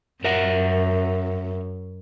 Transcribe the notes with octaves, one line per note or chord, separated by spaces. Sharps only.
F#2 A#4 E5 F#5